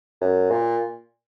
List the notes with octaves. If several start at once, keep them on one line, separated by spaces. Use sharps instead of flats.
F#2
A#2